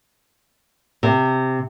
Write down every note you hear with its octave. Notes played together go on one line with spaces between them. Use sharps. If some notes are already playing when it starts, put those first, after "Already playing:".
C3